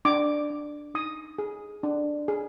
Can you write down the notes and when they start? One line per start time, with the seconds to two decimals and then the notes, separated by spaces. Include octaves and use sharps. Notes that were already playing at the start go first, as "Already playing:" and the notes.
0.05 D4 D6
0.50 D4
0.94 D#4 D#6
1.38 G#4
1.83 D4
2.28 G#4